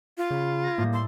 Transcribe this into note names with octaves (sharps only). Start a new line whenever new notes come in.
F4
C#3 B5 G#6
G#6 A#6
A2 G3 A#3
A4 C6